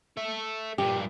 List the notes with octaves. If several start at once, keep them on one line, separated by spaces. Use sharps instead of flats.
A4 E5
G2 A#2 G4